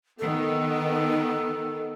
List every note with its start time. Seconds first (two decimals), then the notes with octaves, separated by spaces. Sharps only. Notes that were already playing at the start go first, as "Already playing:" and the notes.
0.19 D#3 B3 A4